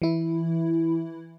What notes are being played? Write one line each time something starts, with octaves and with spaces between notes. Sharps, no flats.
E3 E4